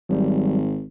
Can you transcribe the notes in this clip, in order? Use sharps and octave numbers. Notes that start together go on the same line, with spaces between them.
G#1 F#3 G3